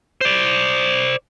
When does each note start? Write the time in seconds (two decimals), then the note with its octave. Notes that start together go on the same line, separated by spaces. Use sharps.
0.21 C5 D5